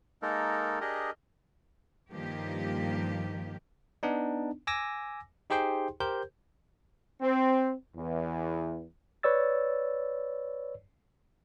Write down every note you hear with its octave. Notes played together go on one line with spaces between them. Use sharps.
G#3 A#3 D#4 A4 A#4
D4 G4 G#4 A#4 D#5
G2 D#3 F3 A#3 G4
B3 D4 D#4
G#5 D6 E6 A#6
D#4 G4 G#4 C5 G5 C6
G4 A#4 C5 G6
C4
E2
B4 C#5 D5 E6 A6